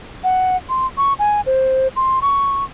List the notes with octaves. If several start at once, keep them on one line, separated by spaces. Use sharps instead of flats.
F#5
C6
C#6
G#5
C5
C6
C#6